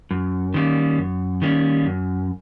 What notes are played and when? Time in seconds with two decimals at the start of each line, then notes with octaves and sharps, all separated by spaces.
0.11 F#2
0.54 D#3 G3 A#3 C#4
0.98 F#2
1.42 D#3 G3 A#3 C#4
1.86 F#2